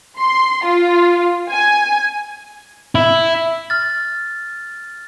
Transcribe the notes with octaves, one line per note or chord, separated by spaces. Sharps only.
C6
F4
G#5
E4
F6 A6